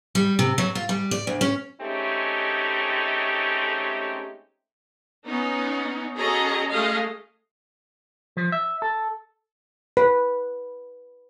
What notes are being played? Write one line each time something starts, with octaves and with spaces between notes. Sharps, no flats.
G3
C3
F#3
F4
G3
D5
D2
C#4
G#3 A3 C4 C#4 D#4 G4
B3 C#4 D#4
C#4 F#4 G#4 A4 D#5 A#5
G#3 A3 G#4 D#5 F5
F3
E5
A4
B4